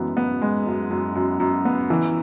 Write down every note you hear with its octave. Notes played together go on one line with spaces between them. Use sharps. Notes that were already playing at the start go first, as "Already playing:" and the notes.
Already playing: F#2 E3 G#3 B3
B3
G#3
F#2
F#2
F#2
F#2
B3
E3